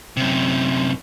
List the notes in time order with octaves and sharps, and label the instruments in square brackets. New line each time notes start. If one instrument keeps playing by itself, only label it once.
[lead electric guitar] F#2 C3